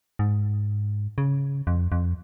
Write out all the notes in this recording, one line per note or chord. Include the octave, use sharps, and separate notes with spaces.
G#2
C#3
F2
F2